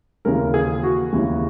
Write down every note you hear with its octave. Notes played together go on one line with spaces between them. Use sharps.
D#2 C#3 E3 A#4
G#4
F#4
D#2 C#3 E3